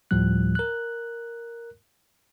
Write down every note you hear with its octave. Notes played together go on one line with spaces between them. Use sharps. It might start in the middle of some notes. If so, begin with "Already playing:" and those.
D2 A2 F3 G3 F#6
A#4 F#6